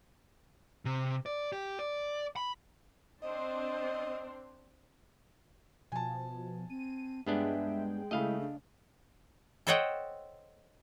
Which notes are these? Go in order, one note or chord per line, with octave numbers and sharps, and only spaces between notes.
C3
D5
G4
D5
B5
C4 D4 C5 D#5
B2 F3 G#5 A5
C4 D#7
G2 G#3 B3 D4 G#4 E5 G5
C#3 A3 E4 D#5 F5
D4
A4 C5 C#5 D#5 F#5 G5